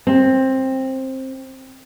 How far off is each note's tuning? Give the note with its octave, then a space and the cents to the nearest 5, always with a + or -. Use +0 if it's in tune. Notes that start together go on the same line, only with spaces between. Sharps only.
C4 +15